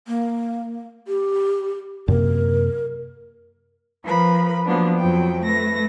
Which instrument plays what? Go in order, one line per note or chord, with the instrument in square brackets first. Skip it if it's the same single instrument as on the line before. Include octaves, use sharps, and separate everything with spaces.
[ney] A#3
G4
[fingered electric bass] F#2 C3 A#3 [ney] A#4
[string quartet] F3 A#4 B4 B5
F3 F#3 A#3 B3 D4
F2 F3 F#3 G5
A3 B4 A#6